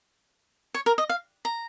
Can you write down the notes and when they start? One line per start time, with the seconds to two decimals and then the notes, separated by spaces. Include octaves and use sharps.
0.74 C#5
0.86 A#4
0.98 D#5
1.09 F5
1.45 A#5